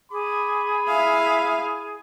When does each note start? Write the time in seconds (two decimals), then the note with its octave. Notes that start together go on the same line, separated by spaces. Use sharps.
0.11 G#4 B5 D6
0.88 E4 E5 F5